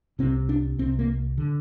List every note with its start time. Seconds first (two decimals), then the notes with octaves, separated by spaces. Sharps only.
0.19 C2 C3 C4
0.49 D4
0.78 C2 C3 C4
0.99 A#3
1.38 D3